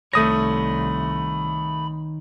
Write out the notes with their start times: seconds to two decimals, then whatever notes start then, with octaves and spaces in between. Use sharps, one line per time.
0.13 C2 D#3 A3 C#5 B5 D#6 A#6